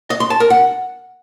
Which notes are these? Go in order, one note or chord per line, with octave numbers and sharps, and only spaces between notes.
D#5
C6
A5
A#4
F#5